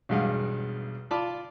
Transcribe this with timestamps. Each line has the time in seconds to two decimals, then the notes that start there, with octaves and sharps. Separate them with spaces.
0.09 B1 E2 G2 G#3 F5 F#5
1.11 F4 D5 A5 B5 D6